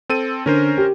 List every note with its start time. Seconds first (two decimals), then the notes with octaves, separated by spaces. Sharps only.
0.10 C4 A4 D#7
0.46 D3 C#4 A#4 C5
0.77 G4